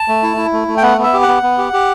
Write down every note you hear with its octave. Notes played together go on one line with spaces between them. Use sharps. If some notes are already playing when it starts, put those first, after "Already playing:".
Already playing: A5
A3
E4
E4
A3
A3
G5
B3 F#5
B3 E5
G4
F#5
B3
B3
G4
G4